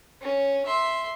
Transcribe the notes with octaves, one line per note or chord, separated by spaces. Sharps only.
C#4
E5 C6